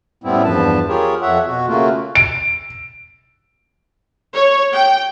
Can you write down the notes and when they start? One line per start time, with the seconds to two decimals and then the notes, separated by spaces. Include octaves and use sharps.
0.24 F#2 A2 G3 B3 C4 E4
0.44 E2 G2 F3 B4 A5
0.89 F4 G4 G#4 A#4 C#5
1.22 F2 C#5 E5 F#5
1.47 B2 F#4
1.67 C#3 A3 A#3 F4 F#4
2.15 D7
4.35 C#5
4.74 G5